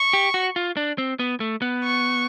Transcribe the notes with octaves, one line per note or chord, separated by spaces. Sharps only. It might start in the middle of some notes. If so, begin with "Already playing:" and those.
Already playing: C#6
G4
F#4
F4
D4
C4
B3
A3
B3
C#6